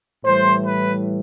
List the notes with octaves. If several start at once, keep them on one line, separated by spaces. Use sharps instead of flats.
A2 E3 G3 C5
B4